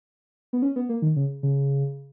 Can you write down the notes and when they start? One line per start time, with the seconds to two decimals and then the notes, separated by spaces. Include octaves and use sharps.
0.53 B3
0.62 C#4
0.76 B3
0.89 A#3
1.02 D#3
1.16 C#3
1.43 C#3